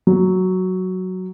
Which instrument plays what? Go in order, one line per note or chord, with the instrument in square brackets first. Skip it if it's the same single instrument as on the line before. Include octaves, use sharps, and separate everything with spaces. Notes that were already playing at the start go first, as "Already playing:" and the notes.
[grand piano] F#3